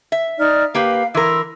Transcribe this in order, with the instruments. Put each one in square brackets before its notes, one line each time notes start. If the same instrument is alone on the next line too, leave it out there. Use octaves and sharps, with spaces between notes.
[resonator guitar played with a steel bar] E5
[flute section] D#4 D5 F6
[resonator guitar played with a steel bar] A#3 G4 B4 [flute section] F5
[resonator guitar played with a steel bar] E3 A#4 [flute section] C6 E6